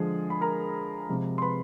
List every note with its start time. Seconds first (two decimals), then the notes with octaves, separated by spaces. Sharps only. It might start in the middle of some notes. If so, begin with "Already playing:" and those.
Already playing: D3 F3 G#3 G#4
0.30 B5
0.41 A#4 A#5
1.09 C3 F3 G#3
1.38 C6
1.42 B4 B5